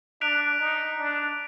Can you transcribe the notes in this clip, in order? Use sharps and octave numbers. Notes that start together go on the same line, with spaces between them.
D4 F#6 B6 D7 F7
D#4
D4